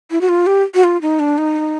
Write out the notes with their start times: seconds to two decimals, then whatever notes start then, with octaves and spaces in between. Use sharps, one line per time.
0.11 E4
0.21 F#4
0.29 F4
0.47 G4
0.75 F#4
0.84 F4
1.02 D#4
1.19 D4
1.38 D#4